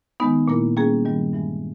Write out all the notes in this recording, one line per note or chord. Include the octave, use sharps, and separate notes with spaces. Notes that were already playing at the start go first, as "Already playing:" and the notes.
D#3 G#3 B3 D#4
A#2 A#3 E4 A#4
G3 A#3 C#4 G#4
G2 D#3 G3
G2 E3 G#3